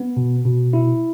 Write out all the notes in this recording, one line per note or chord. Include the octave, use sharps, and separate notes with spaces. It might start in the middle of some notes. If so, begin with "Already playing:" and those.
Already playing: B3
B2
B2
E4